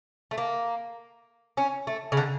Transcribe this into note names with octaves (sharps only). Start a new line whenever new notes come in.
A3
A#3
C#4
A3
C#3
D3